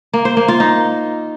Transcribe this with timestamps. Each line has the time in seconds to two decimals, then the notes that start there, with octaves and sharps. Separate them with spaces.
0.13 A#3
0.25 C5
0.37 A#3
0.48 F4
0.60 D#4